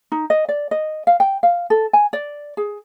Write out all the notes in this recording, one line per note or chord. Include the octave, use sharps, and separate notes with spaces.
D#4
D#5
D5
D#5
F5
G5
F5
A4
G#5
D5
G#4